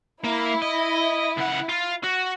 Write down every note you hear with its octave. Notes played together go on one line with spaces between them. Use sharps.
A#3 E4
D#5
C#2 F#5
F4
F#4